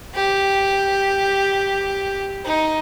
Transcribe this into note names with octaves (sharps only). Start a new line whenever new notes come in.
G4
D#4